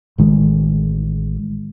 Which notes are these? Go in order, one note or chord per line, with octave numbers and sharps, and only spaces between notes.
A1 D#3 G#3